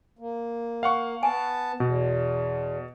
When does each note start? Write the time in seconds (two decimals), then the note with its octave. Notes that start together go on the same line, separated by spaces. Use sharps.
0.19 A#3
0.83 F5 F#5 C#6
1.23 B3 G#5 A5
1.80 E2 B2